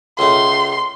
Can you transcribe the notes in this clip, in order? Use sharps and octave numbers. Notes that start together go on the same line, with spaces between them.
C#2 A3 C6